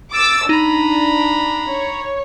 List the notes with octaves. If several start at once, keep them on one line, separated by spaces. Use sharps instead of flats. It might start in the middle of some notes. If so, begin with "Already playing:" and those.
D6 E6 A6
D4 D#4 A#5 B5
C#5